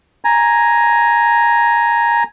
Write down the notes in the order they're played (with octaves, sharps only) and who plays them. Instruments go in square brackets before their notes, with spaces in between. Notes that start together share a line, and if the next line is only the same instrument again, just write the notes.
[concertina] G#5 A#5